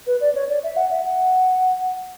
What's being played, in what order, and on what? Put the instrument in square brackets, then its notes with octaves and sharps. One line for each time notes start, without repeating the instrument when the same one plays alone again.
[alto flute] B4
D5
C#5
D5
E5
F#5
E5
F#5